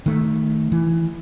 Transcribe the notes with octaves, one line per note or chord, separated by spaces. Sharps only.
D#3 A3
E3